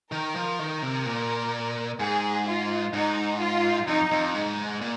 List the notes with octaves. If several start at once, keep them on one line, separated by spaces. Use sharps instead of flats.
D#3 A#4
F3
D#3 A#4
C3
A#2
G#2 G#4
F4
G#2 D#4
F4
F2 D#4
F2
G#2
A#2